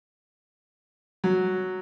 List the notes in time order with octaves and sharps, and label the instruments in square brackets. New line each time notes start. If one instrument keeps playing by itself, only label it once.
[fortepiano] F#3